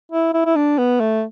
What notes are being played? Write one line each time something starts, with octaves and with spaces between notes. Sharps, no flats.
E4
E4
E4
D4
B3
A3